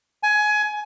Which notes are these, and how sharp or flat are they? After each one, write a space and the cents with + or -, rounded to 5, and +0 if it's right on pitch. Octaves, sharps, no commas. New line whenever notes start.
G#5 +20